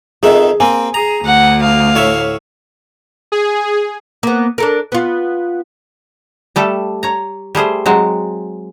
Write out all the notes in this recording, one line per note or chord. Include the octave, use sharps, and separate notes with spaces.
F2 D#3 G#4 E5
A#3 C4 G#5
G#4 A#5
D2 F#5
F5
A2 C#5 E5
G#4
A#3 B3
D4 A4 A#4
B3 F4
G3 A3 A4
C#5 A#5
G3 A3 G#4 C5
F#3 G#3 C4